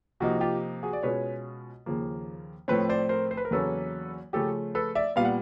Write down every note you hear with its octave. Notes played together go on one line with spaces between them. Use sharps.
C3 F3 A#3 D#4 F#4
F4 G4
F#4 G#4
D5
B2 G#3 C#4 F4 B4 C#5
D#2 C#3 F3 A#3
A2 F3 A3 C4 B4 C#5
C5 D5
A#4 C5
C5
B4
A#4
E2 C#3 F#3 A#3 C#4 A4 B4
C#3 F3 A3 C#4 F4 G4 A4
A4 B4
D5 E5
A#2 G3 B3 F5
F#5